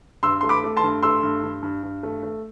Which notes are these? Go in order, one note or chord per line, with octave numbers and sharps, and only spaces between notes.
G2 C6 E6
A3 C6
B5 D6
A3
A5 C6
G2
A3 C6 E6
G2
G2
G2
G2
A3
A3